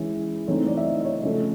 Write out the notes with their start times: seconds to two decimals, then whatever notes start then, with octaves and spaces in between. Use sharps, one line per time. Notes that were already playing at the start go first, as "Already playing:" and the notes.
Already playing: E3 G#3 C#4 E4
0.48 E3 A3 C4 D#4 C#5
0.66 D5
0.77 E5
0.85 D#5
1.04 C#5
1.23 C#3 F3 A3